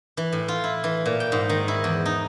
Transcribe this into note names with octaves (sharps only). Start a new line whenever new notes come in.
E3
A2
F4
E4
E3
A#2
G5
G#2
D#3
E4
E2
D#4